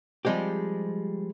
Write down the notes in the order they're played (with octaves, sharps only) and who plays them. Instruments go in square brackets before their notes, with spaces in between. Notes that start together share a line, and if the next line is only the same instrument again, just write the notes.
[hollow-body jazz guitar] F3 G3 G#3 C4 G4